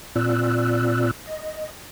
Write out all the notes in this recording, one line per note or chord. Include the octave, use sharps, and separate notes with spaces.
A#2 C4 F4 D5 E6 F#6
D#5